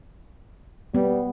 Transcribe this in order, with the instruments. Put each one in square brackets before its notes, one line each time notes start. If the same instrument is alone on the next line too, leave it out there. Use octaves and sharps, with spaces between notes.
[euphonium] G3 [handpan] B3